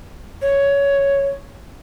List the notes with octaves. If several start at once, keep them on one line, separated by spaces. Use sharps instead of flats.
C#5